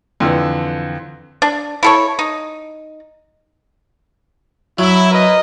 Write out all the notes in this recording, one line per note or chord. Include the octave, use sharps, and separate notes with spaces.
F2 D3 E3
D4
E4 A4 C#5
D#4
F#3 E4
A#4 B4 D#5